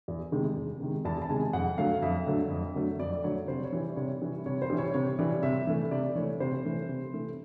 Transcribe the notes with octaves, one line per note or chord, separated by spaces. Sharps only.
E2
C3 D#3 G#3
E2
C3 D#3 G#3
E2 A5
A5
C3 D#3 G#3 G#5
F2 F#5
D3 F#3 A3 F5
F2 E5
D3 F#3 A3
F2
D3 F#3 A3
F2 D5
D3 F#3 A3 C#5
C3 C5
C#5
E3 G3
D5
C3 C#5
E3 G3
C3 C#5
C5
E3 G3
C#5
C3 C#5
E3 G3 D5
C3 E5
E3 A3 E5
C3 D5
E3 A3 C#5
C3 C5
E3 A3
C3
E3 A3